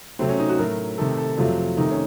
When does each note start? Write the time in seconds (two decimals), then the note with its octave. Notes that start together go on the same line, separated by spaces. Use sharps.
0.19 C3 F#3 A3 C4
0.29 C#4
0.39 D#4
0.49 F#4
0.59 A2 F#3 A3 A#4
0.98 C3 D#3 A3 A4
1.18 A4
1.37 F2 C3 F#3 A3 F4
1.77 C3 D#3 A3 D#4
1.91 C#4